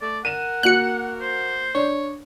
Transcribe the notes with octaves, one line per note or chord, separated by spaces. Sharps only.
A3 D5
A#4 F#5 D#7 E7
A#3 F#4 F#6 C#7
C5
D4 C#5